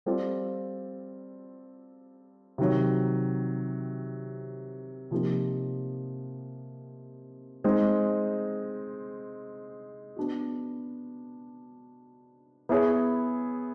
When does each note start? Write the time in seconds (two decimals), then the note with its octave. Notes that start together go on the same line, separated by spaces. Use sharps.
0.06 G3 C4 F4 A4 D5
2.58 C3 D#3 F#3
5.11 C3 F3 A#3 D#4 G4
7.64 G#3 C4 D#4
10.16 B3 D4 F#4
12.69 B3 E4 G#4 C#5